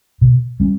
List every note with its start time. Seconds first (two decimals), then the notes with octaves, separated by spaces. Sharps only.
0.21 B2
0.60 G3 C#4